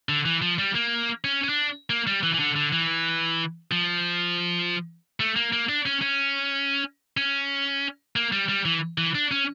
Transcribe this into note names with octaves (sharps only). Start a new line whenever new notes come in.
D3
E3
F3
G3
A#3
C#4
C#4
D4
A#3
G3
E3
E3
D3
D3
E3
F3
A3
A#3
A#3
D4
C#4
C#4
C#4
A#3
G3
G3
E3
E3
D4
C#4